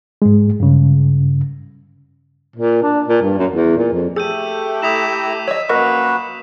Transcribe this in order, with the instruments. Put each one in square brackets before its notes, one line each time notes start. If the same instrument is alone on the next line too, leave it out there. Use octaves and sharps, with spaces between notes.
[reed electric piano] G#2 G#3
G2 C#3
[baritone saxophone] A#2
D4
A#2
G2
F#2
E2
A#2
F2
[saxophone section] A3 G4 [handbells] G#4 [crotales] E6 G6 D#7
[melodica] E4 A#5 [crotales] D#6 B6 E7
[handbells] C#5 D#5 [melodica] E6
[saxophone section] F#2 F3 A#3 [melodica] F#4 B4 [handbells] A#4 D#5 C#6